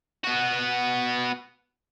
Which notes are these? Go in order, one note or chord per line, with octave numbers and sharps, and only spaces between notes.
B3 F#4